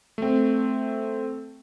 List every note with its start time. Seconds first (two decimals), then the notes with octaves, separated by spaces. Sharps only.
0.18 A3 C4